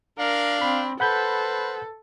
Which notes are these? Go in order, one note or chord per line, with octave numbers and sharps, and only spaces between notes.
D4 A#4 F5
C4 B5
A4 B4 C5 F#5 B5 G6